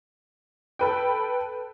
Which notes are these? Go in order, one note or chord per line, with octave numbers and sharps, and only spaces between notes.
A4 B4 G5